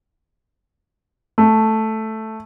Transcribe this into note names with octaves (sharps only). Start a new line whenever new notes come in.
A3